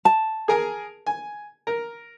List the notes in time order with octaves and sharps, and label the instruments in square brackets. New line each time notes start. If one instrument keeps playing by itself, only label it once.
[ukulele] A5
[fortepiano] G#4 A#4 G#5
G#5
A#4